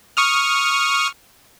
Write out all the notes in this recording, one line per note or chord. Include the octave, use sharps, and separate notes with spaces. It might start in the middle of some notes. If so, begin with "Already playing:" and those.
C#6 D#6 F6